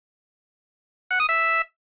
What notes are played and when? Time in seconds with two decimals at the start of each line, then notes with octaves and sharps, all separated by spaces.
1.11 F#5
1.20 D#6
1.29 E5